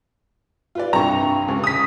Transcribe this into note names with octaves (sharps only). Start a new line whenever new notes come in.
F4 B4 D5
C2 G2 A#5 C#6
C#2
D#6 B6